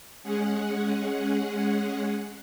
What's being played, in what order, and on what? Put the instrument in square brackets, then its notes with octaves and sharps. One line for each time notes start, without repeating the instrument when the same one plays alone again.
[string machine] G#3 C#4 G#4 F#5